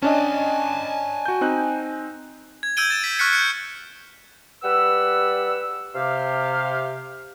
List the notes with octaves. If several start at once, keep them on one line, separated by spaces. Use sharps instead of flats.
C#4 D4 D#5 G#5 A5
F#4 G6
C4 D#4 F#6
G#6
E6 G6 G#6 D7 D#7 G7
A6 E7
B6
C#6 F6 F#6 B6 C#7
G6 C#7
G3 B4 F#5 E6
C3 G4 F5